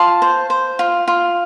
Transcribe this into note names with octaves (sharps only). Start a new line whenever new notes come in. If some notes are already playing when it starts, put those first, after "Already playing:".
Already playing: F4 A5 C6
C5
C5
F4
F4